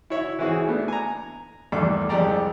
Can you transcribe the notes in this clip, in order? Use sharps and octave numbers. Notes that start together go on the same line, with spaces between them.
E4 F#4 C#5 E5
E3 C4 E4 F#4 G#4
A3 B3 D4
G#5 A#5
A#1 E2 G2 A3 A4 D6
C2 F2 G#3 G4 D5 A#5